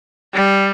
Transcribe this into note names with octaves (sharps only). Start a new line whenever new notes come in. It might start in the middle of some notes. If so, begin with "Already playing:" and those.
G3